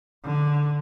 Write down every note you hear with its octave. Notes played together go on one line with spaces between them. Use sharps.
D3